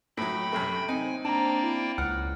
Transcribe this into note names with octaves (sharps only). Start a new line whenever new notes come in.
A2 F#3 G5 B5
F#2 C3 A3
C4 D#4 G#5
A#3 D4 D5 G5 A5 A#5
E4
C#2 F#5 F6